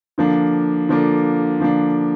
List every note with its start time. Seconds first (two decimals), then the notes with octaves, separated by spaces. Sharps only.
0.18 D3 F3 A#3 D4
0.89 D3 F3 A#3 D4
1.60 D3 F3 A#3 D4